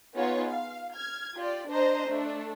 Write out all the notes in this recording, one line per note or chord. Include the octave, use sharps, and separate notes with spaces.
B3 D#4 F4 G#4 C#5
F5
F6 G#6
F4 G4 D5
D4 C5 D#5 A#5
A3 D4